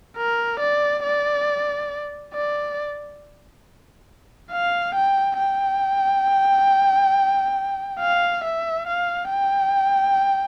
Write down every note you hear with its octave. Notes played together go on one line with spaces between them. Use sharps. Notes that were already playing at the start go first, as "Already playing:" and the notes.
A#4
D5
D5
D5
F5
G5
G5
F5
E5
F5
G5